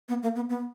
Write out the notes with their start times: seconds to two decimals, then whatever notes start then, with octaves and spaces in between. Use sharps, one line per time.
0.09 B3
0.23 A#3
0.36 B3
0.49 B3